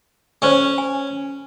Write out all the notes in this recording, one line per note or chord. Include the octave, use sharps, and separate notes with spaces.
C#4 A4 C5 C#5
G#5